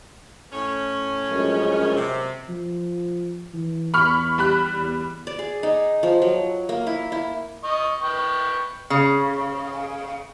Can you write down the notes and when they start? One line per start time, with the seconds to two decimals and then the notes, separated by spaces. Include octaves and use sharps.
0.53 A2 C#4
1.29 A#1 F#2 G#3
1.95 C3
2.49 F3
3.54 E3
3.94 E2 B5 C#6 F6
4.38 G3 B5 F#6
4.76 E2
5.27 D5
5.39 G#4
5.63 D#4
6.03 F3
6.22 F#3
6.69 A#3
6.87 E4
7.12 E4
7.64 D#5 C#6
8.02 B4 G5 C#6
8.90 C#3